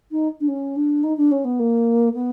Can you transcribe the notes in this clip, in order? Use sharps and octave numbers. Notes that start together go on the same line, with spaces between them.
D#4
D4
C#4
D4
D#4
D4
C#4
B3
A#3
B3